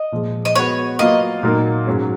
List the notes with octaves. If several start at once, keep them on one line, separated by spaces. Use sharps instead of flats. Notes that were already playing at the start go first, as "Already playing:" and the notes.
Already playing: D#5
A#2 F3 G#3
D#5
G#3 B3 F#4 B4 C#5
F#3 A#3 F4 B4 D#5 F5
A#2 F#3 A#3 D#4 A#4
G#2 F#3 C#4